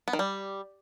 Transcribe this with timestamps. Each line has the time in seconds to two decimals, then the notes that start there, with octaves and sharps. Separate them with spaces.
0.08 B3
0.13 D#3
0.19 G3